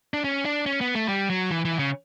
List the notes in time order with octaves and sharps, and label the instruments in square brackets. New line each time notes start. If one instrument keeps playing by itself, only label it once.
[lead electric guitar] D4
C#4
D4
C#4
B3
A3
G3
F#3
E3
E3
C#3